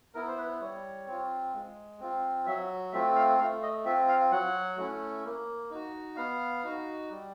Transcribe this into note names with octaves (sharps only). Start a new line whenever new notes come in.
B3 E4 A#4
C5
B4
G3 C#5
C4 F4
G#3
C4 F4
F#3 E5
A3 C4 F4 E5
F5
A3 F5
D#5
C4 F4 E5
F5
F#3 F#5
A3 C#4 E4
A#3
D#4 F#4
B3 F5
D#4 F#4
G3